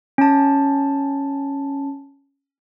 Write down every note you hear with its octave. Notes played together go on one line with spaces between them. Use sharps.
C#4 A5